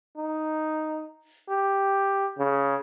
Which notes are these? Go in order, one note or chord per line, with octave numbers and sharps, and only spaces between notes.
D#4
G4
C#3